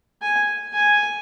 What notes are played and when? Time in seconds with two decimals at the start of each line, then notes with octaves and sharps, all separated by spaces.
0.22 G#5
0.74 G#5